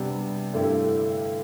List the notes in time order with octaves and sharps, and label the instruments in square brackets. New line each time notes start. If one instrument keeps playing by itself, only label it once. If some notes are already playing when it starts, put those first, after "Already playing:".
Already playing: [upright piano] C3 G3 B3 D4
G2 D3 A3 E4 G4